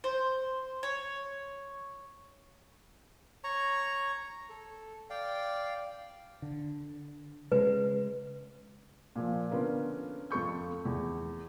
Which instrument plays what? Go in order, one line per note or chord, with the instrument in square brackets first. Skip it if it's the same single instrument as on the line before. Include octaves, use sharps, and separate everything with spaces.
[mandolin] C5
C#5
[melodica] C#5 A#5 C#6
A4
D5 F5 G5
[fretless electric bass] D3
[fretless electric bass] C#3 G#3 [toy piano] B4
[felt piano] A#2 F3
D3 B3 C#4 F4 A#4 B4
F2 F4 A4 C#6 G6
E2